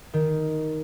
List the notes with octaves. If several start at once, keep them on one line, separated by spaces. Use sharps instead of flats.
D#3